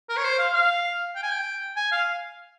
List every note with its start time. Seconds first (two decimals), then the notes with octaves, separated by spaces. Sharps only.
0.09 A#4
0.17 C#5
0.24 C5
0.39 F5
0.54 F5
1.15 G5
1.23 G#5
1.31 G5
1.76 G#5
1.92 F5